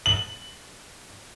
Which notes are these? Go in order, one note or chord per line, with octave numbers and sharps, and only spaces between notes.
F#7